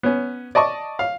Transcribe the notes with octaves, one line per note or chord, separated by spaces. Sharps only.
B3 C#4
D5 D#5 A5 C#6
F5